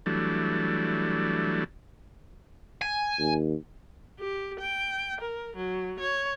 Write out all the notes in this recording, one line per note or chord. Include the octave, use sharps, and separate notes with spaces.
E3 F#3 G3 A3 D4
G#5
D#2
G4
G5
A#4
F#3
C#5